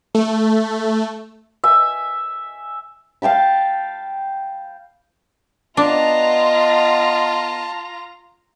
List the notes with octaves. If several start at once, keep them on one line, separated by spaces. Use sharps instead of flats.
A3
E5 G#5
F5 G5 A5 B5
B3 D4 F4 D#5 A5 A#5